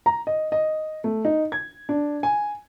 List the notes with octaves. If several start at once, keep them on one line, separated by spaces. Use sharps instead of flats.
A#5
D#5
D#5
A3
D#4
G#6
D4
G#5